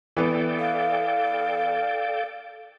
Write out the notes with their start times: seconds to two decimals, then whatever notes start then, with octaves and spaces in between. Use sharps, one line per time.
0.17 E3 B3 A4 D5 G5
0.59 F5